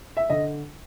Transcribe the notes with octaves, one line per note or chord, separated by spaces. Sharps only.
E5
D3 D#5